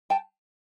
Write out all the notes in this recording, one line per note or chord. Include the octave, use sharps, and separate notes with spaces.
G5 A5